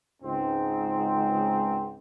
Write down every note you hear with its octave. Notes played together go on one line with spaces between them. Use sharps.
C#2 G#2 C4